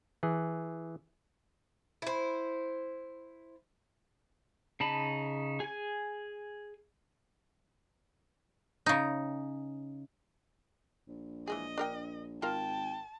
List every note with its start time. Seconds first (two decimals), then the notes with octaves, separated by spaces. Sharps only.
0.23 E3 G#4
2.02 E4 C5
4.80 C#3 D#4 A5 B5
5.60 G#4 G#5
8.86 C#3 D#4
11.08 A#1
11.47 E3 G#3 G#4 D#5
11.78 D4 A#4 G5
12.42 G#1 F4 A#4 F5 G5 A5